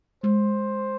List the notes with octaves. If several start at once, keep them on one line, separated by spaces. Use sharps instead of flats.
G#3 C5